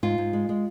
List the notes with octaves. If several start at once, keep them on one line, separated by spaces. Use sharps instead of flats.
G#2 F4
G#2
G#3
G#3